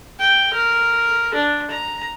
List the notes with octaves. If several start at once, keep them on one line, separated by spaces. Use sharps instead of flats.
G5
A#4
D4
A#5